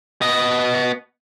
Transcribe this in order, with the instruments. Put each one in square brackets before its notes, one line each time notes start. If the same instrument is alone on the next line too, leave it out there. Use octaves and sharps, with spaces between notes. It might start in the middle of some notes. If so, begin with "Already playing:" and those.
[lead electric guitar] B3 D#5